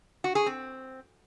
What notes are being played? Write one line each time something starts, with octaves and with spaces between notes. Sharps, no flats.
F#4
G#4
C4